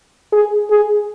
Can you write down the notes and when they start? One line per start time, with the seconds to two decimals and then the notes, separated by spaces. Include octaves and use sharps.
0.33 G#4
0.70 G#4